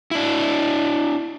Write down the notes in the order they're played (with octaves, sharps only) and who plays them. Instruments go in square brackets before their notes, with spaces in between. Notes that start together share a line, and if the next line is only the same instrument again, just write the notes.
[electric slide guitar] D4 E4